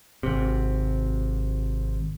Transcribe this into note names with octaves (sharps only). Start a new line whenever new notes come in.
G#1 C3